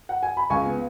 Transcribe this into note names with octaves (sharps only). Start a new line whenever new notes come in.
F#5
G#5
B5
C#2 G#5 C#6
B3